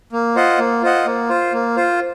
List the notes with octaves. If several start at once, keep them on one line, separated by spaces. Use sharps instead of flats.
A#3
F4 C5 D#5 F#5
A#3
F4 C5 D#5 F#5
A#3
F4 C5
A#3
F4 C5